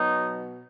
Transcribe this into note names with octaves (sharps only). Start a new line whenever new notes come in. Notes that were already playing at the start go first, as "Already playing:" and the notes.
Already playing: B2 F#3 D#4